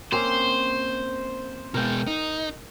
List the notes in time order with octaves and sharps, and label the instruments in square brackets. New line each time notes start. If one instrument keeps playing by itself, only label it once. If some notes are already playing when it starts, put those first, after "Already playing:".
[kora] A#3 C4 C#4 [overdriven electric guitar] C5
[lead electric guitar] B2 G#3 [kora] A#4 G5
[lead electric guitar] D#4